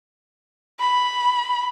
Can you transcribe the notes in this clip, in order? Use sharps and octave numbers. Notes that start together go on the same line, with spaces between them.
B5